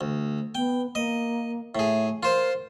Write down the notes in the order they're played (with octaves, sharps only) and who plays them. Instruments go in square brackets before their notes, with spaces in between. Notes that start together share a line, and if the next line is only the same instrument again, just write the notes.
[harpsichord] D2
[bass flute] B3 [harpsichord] G5
[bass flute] A#3 [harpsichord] D#5
[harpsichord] A2 G#4 [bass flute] E5
[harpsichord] F4 C5 [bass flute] A#4